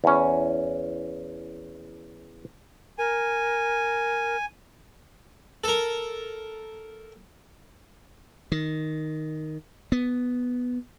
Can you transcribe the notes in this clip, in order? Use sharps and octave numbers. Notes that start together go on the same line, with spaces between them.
E2 C#4
A#4 G#5
A4 A#4
D#3
B3